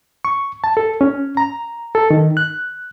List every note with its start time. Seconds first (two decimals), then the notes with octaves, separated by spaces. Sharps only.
0.25 C#6
0.64 A5
0.77 A4
1.01 C#4
1.37 A#5
1.95 A4
2.10 D#3
2.37 F#6